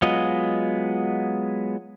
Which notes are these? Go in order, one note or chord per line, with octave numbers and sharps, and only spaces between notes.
F#3 G#3 B3 F4 D#5